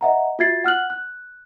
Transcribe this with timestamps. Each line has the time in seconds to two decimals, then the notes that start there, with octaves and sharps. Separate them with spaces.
0.01 D#5 E5 F#5 A#5
0.39 F4 F#4 E5 G#6 A6 C7
0.64 F#5 F6 F#6 F#7
0.90 F#6